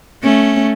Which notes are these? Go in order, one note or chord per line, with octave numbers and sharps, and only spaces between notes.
A3 C#4